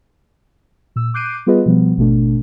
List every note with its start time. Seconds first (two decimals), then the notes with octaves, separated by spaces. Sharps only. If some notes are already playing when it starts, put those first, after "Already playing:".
0.96 A#2 E6
1.14 D6 F#6 G6 C7 D7 D#7
1.47 G3 B3 F4 G#4 B4 D#5
1.66 B2 F3 G3 B3
1.98 G#1 B2 A3 D4